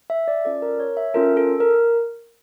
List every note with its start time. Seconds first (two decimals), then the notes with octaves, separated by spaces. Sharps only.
0.10 E5
0.28 D5
0.45 C#4 F4 A4 D5
0.62 A#4
0.80 C#5
0.97 E5
1.14 C#4 F4 A4 A#4
1.37 A4
1.60 A#4